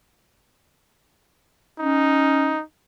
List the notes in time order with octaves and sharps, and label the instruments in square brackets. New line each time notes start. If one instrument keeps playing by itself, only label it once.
[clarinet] C#4 [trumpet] D#4